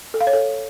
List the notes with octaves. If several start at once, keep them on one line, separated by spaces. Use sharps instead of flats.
A4
F5
C#5
A4